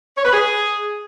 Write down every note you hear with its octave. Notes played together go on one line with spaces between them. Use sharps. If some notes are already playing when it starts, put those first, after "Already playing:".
C#5
B4
G#4